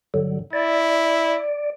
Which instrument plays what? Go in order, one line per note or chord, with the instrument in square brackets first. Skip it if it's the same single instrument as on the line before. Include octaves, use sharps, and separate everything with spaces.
[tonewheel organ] G2 D3 F#3
[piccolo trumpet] E4 [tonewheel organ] D5